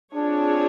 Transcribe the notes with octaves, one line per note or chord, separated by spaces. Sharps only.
C4 D4 F4 G#4 C#5